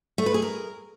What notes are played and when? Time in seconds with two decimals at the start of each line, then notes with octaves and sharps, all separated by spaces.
0.18 A3
0.26 B4
0.34 G#4
0.42 A#4